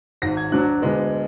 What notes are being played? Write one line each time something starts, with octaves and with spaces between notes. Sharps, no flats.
G#1 G#2 D#3 A#6
G#6
D2 D3 F#3 D4 F#6
D2 D3 G#3 B3